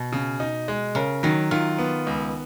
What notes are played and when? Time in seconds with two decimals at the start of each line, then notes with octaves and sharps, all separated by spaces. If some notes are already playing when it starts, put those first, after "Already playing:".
Already playing: B2
0.13 C#3
0.40 D#4
0.68 G#3
0.95 C#3 A#4
1.23 D#3 F#3
1.51 D#3 F4
1.78 B3
2.07 C#2